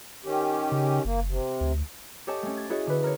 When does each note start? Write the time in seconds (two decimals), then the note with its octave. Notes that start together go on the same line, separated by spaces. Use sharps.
0.24 D#3 C#4 G4
0.72 C#3
1.05 F#1 A#3
1.28 C3
1.61 D2
2.27 G4 A4 C#5 D#5 G#5 A5
2.43 A3 C#4
2.57 G#6 A6
2.70 E4 F#4 G#4 C#5 D#5
2.87 D3 B4
3.03 A#4 C#5